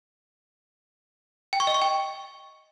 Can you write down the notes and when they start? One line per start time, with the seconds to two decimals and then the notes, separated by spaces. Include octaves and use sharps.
1.53 G5
1.60 C#6
1.67 D#5
1.74 C#6
1.82 G5